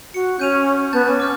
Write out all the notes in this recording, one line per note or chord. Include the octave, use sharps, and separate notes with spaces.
F#4 C#7
C#4 G6 D#7 F7
B3 A5 G6 A6
C#4 G#5 A5 D6
D6 F6 G6